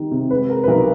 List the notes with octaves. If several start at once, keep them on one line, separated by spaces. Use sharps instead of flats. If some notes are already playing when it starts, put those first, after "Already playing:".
Already playing: D#3 G3
C3
G#3 B4
G#3 A#4
B4
B1 A#4